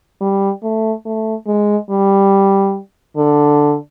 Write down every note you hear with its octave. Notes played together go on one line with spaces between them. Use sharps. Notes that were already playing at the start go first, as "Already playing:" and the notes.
G3
A3
A3
G#3
G3
D3